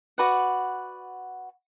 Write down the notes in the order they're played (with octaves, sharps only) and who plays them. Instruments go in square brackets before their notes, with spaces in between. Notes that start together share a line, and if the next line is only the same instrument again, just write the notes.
[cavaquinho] F#4 B4 D5 F#5